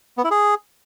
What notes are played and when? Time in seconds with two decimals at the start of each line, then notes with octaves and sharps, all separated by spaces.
0.18 B3
0.24 E4
0.31 G#4